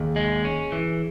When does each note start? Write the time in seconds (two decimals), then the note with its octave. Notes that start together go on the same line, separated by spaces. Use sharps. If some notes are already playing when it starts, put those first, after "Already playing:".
Already playing: D#2 G#4
0.16 G#3
0.45 C#4
0.72 E3